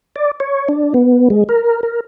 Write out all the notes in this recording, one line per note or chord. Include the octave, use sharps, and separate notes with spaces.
D5
C#5
D4
B3
G#3
A#4
A#4